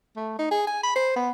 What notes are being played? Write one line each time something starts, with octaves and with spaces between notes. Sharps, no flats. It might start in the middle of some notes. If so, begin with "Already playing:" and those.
A3
D#4
G#4
G#5
B5
C5
B3